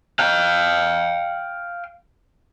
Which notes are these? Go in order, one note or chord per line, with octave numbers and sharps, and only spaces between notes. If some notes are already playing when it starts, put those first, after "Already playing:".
F5 G5